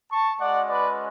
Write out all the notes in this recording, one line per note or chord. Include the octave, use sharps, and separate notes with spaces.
A5 C#6
G#3 C#4 F#4 D5 F#5
B4 D5